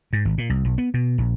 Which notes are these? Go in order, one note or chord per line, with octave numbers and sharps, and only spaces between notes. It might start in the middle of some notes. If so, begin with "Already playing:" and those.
G#2
G#1
A#2
C2
B1
B3
B2
A#1